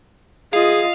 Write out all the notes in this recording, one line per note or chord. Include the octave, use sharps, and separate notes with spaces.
F4 G#4 D#5 F5